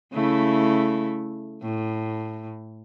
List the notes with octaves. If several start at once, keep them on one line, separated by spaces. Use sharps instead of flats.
C#3 A3 E4
A2